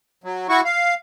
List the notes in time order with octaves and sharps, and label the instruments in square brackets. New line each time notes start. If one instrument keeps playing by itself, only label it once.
[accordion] F#3
E4 F#4 F#5 C#6
F5